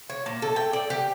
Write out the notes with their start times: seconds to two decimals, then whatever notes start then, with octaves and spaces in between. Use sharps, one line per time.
0.10 C#5
0.26 A#2
0.42 A4
0.56 G5
0.73 D5
0.90 G4